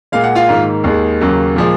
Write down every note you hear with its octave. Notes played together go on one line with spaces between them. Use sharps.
A#2 G#3 F5
F#5
F4 F5
G#2 D#3 A#3
D#2 D#3 G#3
D#2 C#3 F#3 A#3
A#2 F3 G#3